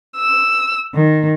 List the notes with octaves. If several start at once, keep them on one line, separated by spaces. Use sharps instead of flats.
E6
D#3